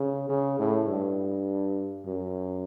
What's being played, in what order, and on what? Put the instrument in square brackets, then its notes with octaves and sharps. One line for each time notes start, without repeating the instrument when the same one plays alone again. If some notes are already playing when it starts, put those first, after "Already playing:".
Already playing: [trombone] C#3
C#3
A2
G2
F#2